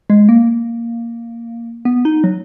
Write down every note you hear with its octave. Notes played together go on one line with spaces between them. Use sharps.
G#3
A#3
B3
D#4
F#3